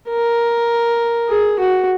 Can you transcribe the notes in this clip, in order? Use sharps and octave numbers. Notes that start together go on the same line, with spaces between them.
A#4
G#4
F#4